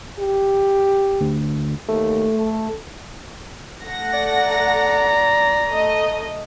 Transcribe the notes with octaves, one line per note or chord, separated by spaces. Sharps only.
G4
D2
D#2 A3
A4
A3 F#5 A#6
D5
A#5
A3 D#5